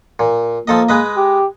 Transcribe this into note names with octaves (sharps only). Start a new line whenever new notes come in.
A#2
F3 A#3 A4 D#5
G#3 B4 D#5
G4